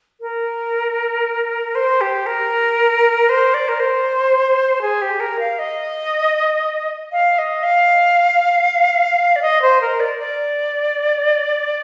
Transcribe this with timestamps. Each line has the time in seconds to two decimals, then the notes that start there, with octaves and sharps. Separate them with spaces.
0.20 A#4
1.75 C5
2.00 G4
2.26 A#4
3.28 C5
3.53 D5
3.68 A#4
3.79 C5
4.81 G#4
5.01 G4
5.19 A#4
5.39 F5
5.58 D#5
7.12 F5
7.38 D#5
7.63 F5
9.35 D5
9.41 D#5
9.61 C5
9.81 A#4
9.99 D5
10.18 D5